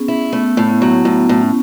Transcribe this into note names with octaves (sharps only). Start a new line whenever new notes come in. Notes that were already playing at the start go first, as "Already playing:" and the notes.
Already playing: B3 C#4 G#4
E4
A3 B3
A2
B3
F#3
A2 B3
A2
C#4